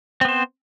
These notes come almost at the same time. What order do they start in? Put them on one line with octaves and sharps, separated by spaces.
C4 B3 C5